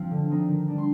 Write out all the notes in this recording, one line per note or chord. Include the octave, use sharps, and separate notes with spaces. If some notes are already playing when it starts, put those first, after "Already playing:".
Already playing: F3 C4
D3
F3 C4 D#4
D#3
G3 D4
C6